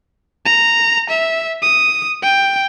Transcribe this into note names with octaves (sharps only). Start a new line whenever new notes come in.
A#5
E5
D#6
G5